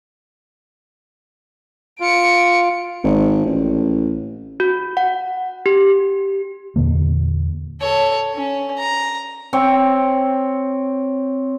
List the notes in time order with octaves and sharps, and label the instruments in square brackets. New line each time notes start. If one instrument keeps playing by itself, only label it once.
[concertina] F4 [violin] C#7 D7
[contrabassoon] G#1
A1
[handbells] F#4
F#5
G4
[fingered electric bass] E2 A#2 D3 A#3
[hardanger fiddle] A4 C#5
C#4
A#5
[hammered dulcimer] C4 C#5 G5